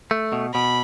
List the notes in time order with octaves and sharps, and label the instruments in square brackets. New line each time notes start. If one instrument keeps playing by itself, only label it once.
[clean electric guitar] A3
B2
[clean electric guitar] B2 [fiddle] B5